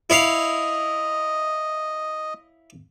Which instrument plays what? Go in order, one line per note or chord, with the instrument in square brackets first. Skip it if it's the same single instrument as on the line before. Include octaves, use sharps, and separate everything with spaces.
[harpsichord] E4 C#5 F5 [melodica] D#5